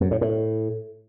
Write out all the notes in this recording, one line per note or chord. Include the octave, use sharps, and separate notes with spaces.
F#2
A2
A2